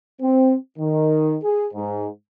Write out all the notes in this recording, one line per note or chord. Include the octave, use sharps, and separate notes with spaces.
C4
D#3
G#4
G#2